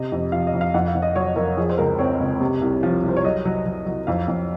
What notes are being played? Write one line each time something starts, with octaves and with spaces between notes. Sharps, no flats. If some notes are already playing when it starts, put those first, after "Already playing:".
Already playing: C3 D#5
F2
F3 F5
D#5
F2
F5
F2 F#5
F5
F2
D#5
F#3 C#5
F2 A#4
F3 G#4
C5
C#2 A#4
C4 C#5
C#2
C3
C2
F3
C2
C5
C#5
F#3 D#5
F#3
F#3
F#3
F2 F5
F2